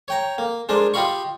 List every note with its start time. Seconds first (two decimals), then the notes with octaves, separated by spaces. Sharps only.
0.08 C#5 G5 A#5
0.38 A#3
0.69 G#3 D4 A#4 C5 D5
0.94 F4 G4 D#5 F5 B5 C#6